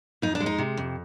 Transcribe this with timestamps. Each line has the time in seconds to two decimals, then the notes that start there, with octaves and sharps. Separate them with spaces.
0.22 F2 D#4
0.35 D4
0.40 G#3
0.46 D#4
0.58 C3
0.77 F2